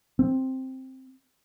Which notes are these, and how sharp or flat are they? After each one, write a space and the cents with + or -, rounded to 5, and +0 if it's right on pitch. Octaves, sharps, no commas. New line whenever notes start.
C4 +5